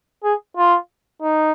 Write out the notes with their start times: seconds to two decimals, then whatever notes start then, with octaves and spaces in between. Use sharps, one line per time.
0.24 G#4
0.57 F4
1.22 D#4